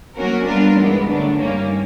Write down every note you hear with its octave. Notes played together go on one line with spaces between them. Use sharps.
F#3 A#3 C#4 F#4 A#4
G3 B3 D4 F4 A#4
G2 E3 G#3 B3
D3 F#3 A3 D4
G2 D#3 G3 A#3 C#4